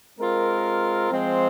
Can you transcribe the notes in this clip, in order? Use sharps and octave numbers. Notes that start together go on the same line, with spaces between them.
G#3 C4 F4 A#4
F3 G#3 C4